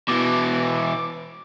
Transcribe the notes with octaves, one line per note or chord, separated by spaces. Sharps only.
B2 E3 D6